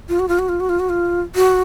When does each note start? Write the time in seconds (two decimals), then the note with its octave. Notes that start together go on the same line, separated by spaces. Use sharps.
0.09 F4
0.19 F#4
0.28 F4
0.39 F#4
0.49 F4
0.60 F#4
0.69 F4
0.80 F#4
0.89 F4
1.35 F#4